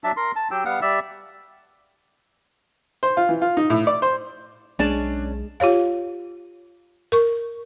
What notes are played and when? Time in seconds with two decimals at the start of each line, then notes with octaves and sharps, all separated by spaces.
0.04 F#3 D4 E5 A5
0.17 A#4 C6
0.36 A5
0.51 F#3 G4 G5 E6
0.65 G3 B3 F5 F#5
0.82 G3 D5 E5 E6
3.03 C5
3.17 F4
3.29 E3
3.41 F4
3.57 D#4
3.70 A2
3.87 D5
4.02 C5
4.79 B1 G#3 C#4 D4 D5 A5
5.60 F4 G4 C#5 F5
7.12 A#4 C#6